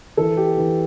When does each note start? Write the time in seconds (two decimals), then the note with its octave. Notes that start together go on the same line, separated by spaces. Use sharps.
0.17 E3 A4
0.37 G4
0.58 E3